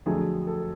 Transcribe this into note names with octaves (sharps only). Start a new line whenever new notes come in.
F2 D3 F#3 A3 G#4
A4